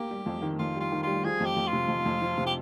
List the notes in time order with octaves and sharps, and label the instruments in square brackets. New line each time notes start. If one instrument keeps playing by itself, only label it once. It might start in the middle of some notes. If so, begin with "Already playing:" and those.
Already playing: [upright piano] A#3 [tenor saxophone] G4
[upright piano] G3
F2
D#3
[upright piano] F2 [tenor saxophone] F4
[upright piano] G3 [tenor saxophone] F4
[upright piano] D#3
[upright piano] G3 [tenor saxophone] F4
[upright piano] F3 [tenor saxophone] G#4
[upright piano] F2 [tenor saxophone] G4
[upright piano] F2
[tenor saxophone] F4
[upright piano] C3
F2
F2
F3
C3
[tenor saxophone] G4